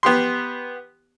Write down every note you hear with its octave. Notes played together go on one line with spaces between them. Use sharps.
B3 G4 C6